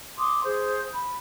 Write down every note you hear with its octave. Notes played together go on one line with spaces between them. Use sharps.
C6 D6 D#6
G#4 C5
B5